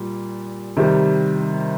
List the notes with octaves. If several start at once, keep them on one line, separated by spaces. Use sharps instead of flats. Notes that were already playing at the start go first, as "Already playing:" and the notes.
Already playing: A#2 G3
C3 D#3 G3